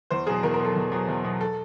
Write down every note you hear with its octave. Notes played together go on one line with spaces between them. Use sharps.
E2 C5
B2 F#3 G#4
E2 A#4
A#4
B2 F#3 A4
E2
B2 F#3
E2
B2 F#3
A4